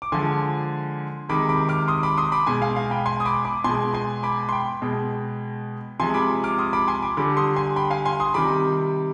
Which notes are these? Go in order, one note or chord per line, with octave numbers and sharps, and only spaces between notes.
D6
D3 F3 G#3 G#5 C6
C3 D#3 G#3 B5 D6
B5 D6
D6 F6
C6 D#6
B5 D6
C6 D#6
B5 D6
B2 G#3 G#5 C6
F5 G#5
F5
G5 B5
G#5 C6
D#6
B5 D6
B5 D6
B2 G#3 G#5 C6
G#5 C6
B5 D6
C6
G5 B5
B2 G#3
C3 F3 G#3 G#5 C6
B5 D6
D6 F6
C6 D#6
B5 D6
G#5 C6
B5 D6
D3 G3 B5 D6
C6 D#6
G#5 C6
G5 B5
F5 G#5
G#5 C6
C6 D#6
C3 D#3 G3 B5 D6